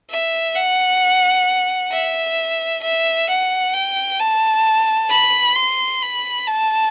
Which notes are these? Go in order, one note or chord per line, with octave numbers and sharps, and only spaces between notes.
E5
F#5
E5
E5
F#5
G5
A5
B5
C6
B5
A5